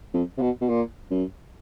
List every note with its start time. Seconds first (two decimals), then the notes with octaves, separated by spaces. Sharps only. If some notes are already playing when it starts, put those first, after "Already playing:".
0.14 F2
0.38 C3
0.41 B2
0.61 B2
0.69 A#2
1.11 F#2